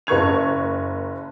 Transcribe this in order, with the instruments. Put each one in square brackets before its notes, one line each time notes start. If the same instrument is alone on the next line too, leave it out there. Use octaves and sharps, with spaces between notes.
[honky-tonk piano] F#1 A#4 C#6 G#6 F7